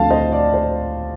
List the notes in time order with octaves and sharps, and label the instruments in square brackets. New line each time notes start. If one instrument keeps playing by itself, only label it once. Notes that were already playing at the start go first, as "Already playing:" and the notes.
Already playing: [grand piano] D2 D3 F3 A3 C4 F5 A5
C5 D#5
D5
C5